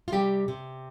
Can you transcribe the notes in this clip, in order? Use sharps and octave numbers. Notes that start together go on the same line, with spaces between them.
F4
C3 G3 G4
C3